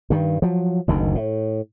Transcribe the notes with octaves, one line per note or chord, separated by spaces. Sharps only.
G2 D#3
F3 F#3
F#1 D2 D#3
A2